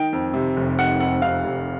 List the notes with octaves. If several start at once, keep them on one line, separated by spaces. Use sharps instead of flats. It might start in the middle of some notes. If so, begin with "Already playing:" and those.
Already playing: D#3 G5
F2
C3
F1
D#3 F#5
F2 F#5
C3 F5
F1